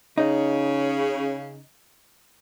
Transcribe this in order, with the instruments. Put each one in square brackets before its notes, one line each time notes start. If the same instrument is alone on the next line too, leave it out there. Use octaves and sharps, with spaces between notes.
[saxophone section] C#3 [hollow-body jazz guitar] D#4